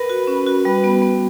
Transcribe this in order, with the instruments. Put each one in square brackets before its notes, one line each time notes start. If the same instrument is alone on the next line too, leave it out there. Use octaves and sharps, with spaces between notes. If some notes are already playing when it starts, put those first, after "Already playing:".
Already playing: [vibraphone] A#4 [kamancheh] B4
[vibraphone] F#4
C#4
F#4
[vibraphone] G3 [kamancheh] B4
[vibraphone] B3
B3